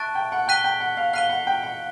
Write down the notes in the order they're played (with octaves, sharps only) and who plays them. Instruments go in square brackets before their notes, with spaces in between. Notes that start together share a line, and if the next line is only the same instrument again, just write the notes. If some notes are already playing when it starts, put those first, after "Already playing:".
Already playing: [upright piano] E5 [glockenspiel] A5 C#6 F#6 A6 D7
[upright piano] G5
F#5
[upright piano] G5 [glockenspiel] F#6 B6 D#7 G7
[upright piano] G5
F#5
F5
[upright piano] F5 [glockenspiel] F#6 B6 D#7 G7
[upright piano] F#5
G5
F#5